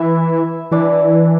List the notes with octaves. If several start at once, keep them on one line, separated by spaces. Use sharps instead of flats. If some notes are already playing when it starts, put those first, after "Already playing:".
Already playing: E3 E4 E5
E3 D4 D5